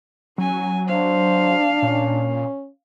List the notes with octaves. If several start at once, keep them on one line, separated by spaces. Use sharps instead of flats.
F#3 C#4 G#5
D4 C5 F5
A#2 C#4